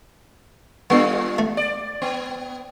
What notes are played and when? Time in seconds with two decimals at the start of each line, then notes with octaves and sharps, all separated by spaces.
0.90 G3 B3 D4 F4
1.38 A3
1.57 D5
2.02 B3